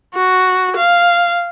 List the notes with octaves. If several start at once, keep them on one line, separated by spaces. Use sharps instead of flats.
F#4
F5